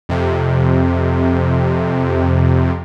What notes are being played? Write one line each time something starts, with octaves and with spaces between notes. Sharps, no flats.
F2 C3